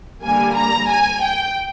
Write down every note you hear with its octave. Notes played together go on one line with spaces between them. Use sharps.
D3 G3 A#3 G#5
A#5
G#5
G5